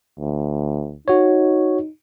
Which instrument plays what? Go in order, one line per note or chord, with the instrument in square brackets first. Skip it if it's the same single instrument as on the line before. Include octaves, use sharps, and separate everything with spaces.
[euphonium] D2
[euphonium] D#4 [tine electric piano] F#4 C#5